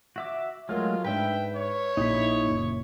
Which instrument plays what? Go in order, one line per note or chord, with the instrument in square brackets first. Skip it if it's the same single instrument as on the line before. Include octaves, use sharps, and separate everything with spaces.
[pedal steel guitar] F#4 E5 D6
[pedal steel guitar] F#3 G#3 A3 [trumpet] F4 [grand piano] A#4 F6
[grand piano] G#2 D4 [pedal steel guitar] B4 E5 [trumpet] G5
[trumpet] C#5
[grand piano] A#1 [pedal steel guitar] D#4 E4 B5
[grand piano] F#1 A#2